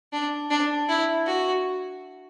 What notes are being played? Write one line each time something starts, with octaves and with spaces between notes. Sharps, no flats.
D4
D4
E4
F#4